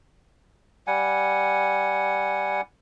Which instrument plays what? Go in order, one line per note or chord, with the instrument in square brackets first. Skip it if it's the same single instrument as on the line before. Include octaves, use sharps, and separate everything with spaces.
[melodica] G3 F#5 G#5